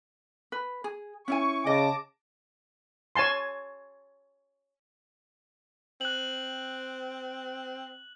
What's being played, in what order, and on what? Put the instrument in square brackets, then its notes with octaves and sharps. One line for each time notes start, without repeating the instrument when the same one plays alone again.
[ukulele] B4
G#4
[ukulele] C#4 E4 G#5 [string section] C#6
[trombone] C#3 [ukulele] D#5 [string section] A5 D6 A#6
[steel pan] C#5 G#5 A5 C6
[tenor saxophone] C4 [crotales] F#6 F#7